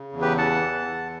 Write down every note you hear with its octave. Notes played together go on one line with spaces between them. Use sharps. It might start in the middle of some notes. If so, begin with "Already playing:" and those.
Already playing: C#3
E2
G4 B4
E3 F#5 A5
E2
E3